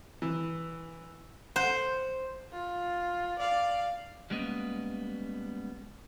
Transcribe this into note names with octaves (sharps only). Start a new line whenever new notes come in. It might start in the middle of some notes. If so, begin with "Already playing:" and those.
E3
C5 F#5
F4
D5 F5
G3 G#3 A#3 B3 C#4 D#5